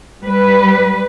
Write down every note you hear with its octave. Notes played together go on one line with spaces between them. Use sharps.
G3 B4